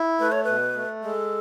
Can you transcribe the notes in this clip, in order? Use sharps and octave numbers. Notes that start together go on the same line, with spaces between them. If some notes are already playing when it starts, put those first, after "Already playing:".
Already playing: E4
A3 B4
C#5
B2 B4
A3
G#3 A4